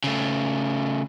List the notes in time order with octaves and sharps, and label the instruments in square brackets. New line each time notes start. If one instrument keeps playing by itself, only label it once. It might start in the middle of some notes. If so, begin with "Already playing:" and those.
[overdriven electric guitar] C#3 A3